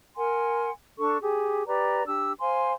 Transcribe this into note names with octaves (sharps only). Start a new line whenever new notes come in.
A#4 F#5 G#5 C6
D4 A4 C#6
G4 G#4
G4 B4 D5 A#5
D4 G4 E6
C5 F5 G#5 C6